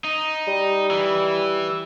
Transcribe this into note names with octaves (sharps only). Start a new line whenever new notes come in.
D#4
G3
E3